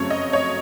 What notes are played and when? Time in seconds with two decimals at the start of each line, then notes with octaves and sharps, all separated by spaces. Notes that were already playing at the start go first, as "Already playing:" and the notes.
Already playing: F#1 F2 C#3 F#3 A3 C#5
0.10 D#5
0.33 C#5